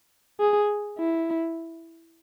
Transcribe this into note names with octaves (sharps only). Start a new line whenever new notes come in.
G#4
E4